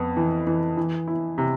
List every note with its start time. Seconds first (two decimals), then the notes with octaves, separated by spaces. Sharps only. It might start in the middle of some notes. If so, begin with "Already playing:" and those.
Already playing: F2 B3
0.17 E3
0.47 E3
0.77 E3
1.08 E4
1.38 C3